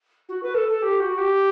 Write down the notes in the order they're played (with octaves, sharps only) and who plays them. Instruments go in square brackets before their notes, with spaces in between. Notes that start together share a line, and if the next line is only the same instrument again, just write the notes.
[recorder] F#4
B4
A4
A4
G4
F#4
G4